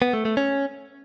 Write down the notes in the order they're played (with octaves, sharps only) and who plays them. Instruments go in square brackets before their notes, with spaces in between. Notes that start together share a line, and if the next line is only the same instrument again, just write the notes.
[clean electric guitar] B3
A3
A3
C#4